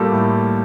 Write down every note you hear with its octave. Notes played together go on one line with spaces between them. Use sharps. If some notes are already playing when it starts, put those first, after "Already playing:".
Already playing: A2 G3 A#3 F4 A4
A2